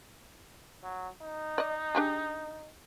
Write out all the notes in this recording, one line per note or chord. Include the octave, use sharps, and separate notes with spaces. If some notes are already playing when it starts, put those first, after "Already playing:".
F#3
D#4
D5 D#5
D4 G4 G#4